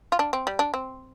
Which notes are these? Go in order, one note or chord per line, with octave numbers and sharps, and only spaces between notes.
F4
D4
C4
G3
D4
C4